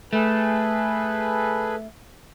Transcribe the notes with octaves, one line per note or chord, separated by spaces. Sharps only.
A3 G#4 A4 B4